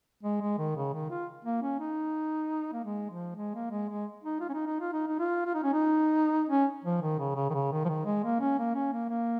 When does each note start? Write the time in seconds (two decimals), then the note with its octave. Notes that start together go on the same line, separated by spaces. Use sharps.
0.23 G#3
0.41 G#3
0.58 D#3
0.76 C#3
0.94 D#3
1.10 F4
1.45 A#3
1.62 C#4
1.80 D#4
2.73 A#3
2.84 G#3
3.11 F3
3.36 G#3
3.55 A#3
3.71 G#3
3.89 G#3
4.24 D#4
4.40 F4
4.49 C#4
4.53 D#4
4.67 D#4
4.81 F4
4.93 D#4
5.08 D#4
5.19 F4
5.45 F4
5.55 D#4
5.64 C#4
5.73 D#4
6.49 C#4
6.84 F3
7.02 D#3
7.19 C#3
7.36 C#3
7.50 D#3
7.54 C#3
7.72 D#3
7.85 F3
7.89 D#3
8.05 G#3
8.24 A#3
8.41 C#4
8.59 A#3
8.75 C#4
8.93 A#3
9.10 A#3